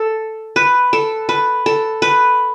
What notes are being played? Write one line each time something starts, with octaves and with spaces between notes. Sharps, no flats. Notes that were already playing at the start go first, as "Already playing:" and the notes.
Already playing: A4
B4
A4
B4
A4
B4